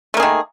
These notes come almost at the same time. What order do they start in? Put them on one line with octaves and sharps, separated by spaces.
A3 A#3 G#4 D#3